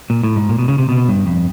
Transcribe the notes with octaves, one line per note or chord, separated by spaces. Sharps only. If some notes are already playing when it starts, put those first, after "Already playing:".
A#2
A2
G#2
A#2
B2
C#3
C3
B2
G2
F2